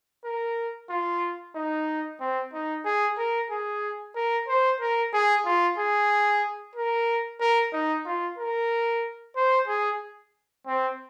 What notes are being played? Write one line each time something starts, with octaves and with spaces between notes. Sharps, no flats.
A#4
F4
D#4
C4
D#4
G#4
A#4
G#4
A#4
C5
A#4
G#4
F4
G#4
A#4
A#4
D#4
F4
A#4
C5
G#4
C4